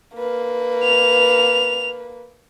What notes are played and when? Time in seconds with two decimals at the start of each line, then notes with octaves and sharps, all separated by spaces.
0.14 A#3 B4
0.84 F7